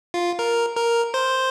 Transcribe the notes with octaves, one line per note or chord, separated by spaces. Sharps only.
F4
A#4
A#4
C5